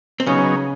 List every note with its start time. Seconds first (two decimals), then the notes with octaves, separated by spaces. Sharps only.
0.20 C4
0.26 C#3 F#3 B3 C#4 D#4 G#4 C#5